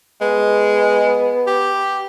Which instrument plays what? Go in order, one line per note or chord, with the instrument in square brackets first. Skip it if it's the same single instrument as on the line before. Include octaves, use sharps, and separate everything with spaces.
[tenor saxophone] G#3 [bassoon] B3
[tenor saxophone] G4